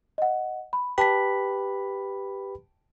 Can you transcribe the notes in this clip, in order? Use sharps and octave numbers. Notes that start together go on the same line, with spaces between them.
D#5 F#5
B5
G4 B4 G5 A5 B5 B6